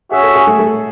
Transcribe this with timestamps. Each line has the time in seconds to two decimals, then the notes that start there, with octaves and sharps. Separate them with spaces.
0.11 C#4 F#4 G#4 C#5 E5
0.23 A4
0.35 G#4
0.47 A3
0.59 A3